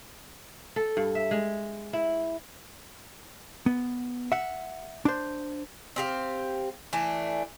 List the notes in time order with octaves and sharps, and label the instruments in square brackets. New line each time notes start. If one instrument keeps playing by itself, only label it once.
[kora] A4
G2
E5
G#3
E4
[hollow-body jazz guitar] B3
E5 F#5
D4 C5
[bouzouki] C4 G4 F5
E3 A3 D4